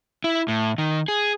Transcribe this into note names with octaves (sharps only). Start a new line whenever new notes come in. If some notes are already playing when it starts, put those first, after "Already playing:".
E4
A2
D#3
G#4